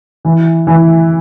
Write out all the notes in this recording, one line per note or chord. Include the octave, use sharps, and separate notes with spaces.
E3
E3